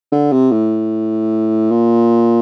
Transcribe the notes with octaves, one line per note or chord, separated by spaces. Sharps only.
D3
C3
A2
A#2